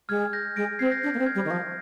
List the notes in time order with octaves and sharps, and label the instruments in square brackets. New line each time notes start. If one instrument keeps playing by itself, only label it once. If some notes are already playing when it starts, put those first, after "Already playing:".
[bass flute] G#3 [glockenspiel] F6 G#6
[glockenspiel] G6 A#6
[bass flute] G#3 [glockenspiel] A#6 D7
[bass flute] C4 [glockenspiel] G#6 C7
[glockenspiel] G6 A#6
[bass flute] D4 [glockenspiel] G6
[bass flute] A#3
C4
[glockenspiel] F6 G#6
[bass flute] G3
D#3
[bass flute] F3 [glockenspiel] G6 A#6